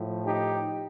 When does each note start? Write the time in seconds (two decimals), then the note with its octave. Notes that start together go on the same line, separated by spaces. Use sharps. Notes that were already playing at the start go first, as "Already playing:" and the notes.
Already playing: A2 F3
0.24 D#4 G4